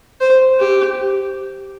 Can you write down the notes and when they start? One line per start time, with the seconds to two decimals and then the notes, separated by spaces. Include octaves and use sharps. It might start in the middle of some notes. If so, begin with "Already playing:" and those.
0.21 C5
0.60 G4